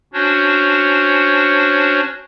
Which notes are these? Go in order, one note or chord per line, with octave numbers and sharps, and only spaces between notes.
C#4 D4 F#4 C5 C#5